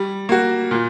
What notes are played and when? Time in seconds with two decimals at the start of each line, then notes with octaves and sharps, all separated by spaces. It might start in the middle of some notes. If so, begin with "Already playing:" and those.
Already playing: G3
0.29 A#3 F#4
0.71 A#2